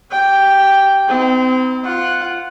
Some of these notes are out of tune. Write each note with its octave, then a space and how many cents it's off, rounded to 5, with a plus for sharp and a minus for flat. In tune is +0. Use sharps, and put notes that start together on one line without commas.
G4 -25 G5 +0
C4 -30 D#4 +40
F4 +0 F#5 +0